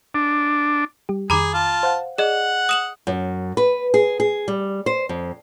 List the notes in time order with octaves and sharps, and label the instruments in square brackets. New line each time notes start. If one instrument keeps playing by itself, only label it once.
[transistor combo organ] D4
[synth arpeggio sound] G3 G4
[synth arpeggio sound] F2 D#3 [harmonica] G#4 [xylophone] A#5 B5 D6
[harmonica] F4 A5
[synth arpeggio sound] C5 F5 F#5
[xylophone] G#4 D#5 [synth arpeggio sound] D5 [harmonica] F#5
[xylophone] D#6 E7 F#7
[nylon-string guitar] F#2
B4
G#4
G#4
G3
C5
F2